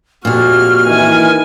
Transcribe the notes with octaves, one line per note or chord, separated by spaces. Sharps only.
F2 A#2 F#4 G4 F6
D#3 E3 G#5